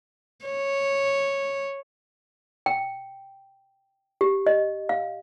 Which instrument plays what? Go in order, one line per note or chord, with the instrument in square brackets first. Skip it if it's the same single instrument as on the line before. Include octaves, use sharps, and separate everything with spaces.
[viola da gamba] C#5
[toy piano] G5
G4
D#5
F5